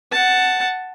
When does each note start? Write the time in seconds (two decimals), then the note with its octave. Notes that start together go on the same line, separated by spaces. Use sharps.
0.12 F#5 A5